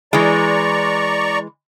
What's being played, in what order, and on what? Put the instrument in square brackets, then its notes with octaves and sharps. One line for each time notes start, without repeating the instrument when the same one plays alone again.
[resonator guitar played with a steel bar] E3 G#3 [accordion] D5 A#5 C#6